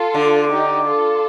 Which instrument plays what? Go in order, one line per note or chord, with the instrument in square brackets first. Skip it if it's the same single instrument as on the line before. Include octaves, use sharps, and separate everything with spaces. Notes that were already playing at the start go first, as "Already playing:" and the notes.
Already playing: [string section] F4 A4
[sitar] D3
[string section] D#4 G4
F4 A4